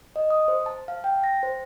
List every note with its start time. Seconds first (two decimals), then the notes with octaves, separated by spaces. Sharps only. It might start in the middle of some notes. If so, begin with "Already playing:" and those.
0.16 D#5
0.30 D#6
0.48 C5
0.66 A5
0.88 F5
1.04 G5
1.24 A#6
1.43 C5